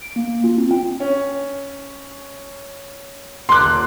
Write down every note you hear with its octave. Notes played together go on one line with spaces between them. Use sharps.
D7
A#3
F4
C4
G5
C#4
D#1 C6 D6 F#6